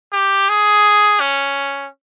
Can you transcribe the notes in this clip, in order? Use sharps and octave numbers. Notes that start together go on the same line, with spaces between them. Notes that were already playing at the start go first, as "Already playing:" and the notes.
G4
G#4
C#4